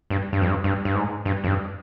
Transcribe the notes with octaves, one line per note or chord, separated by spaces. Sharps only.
G2
G2
F2
G2
G2
G2
G#2
G2
F2
G2